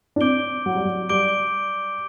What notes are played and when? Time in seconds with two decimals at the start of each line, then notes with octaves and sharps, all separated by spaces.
0.16 D4
0.21 C4 D6 G6 D7 G7
0.66 F#3
0.76 G3
0.85 F#3
1.09 G3 D6 G6 D7 G7